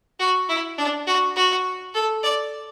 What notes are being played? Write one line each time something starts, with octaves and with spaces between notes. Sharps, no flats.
F#4
E4
D4
F#4
F#4
A4
D5